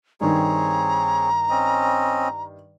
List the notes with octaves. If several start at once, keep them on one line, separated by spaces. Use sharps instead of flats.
G2 D#3 C4 G#4 C#5 A#5
C4 C#4 D#5